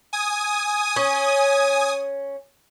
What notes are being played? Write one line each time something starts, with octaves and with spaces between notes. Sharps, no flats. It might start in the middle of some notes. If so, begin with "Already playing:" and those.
G#5 D#6
C#4